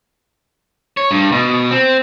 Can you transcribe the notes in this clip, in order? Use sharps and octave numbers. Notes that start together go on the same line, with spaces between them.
C#5
G2
B2
C4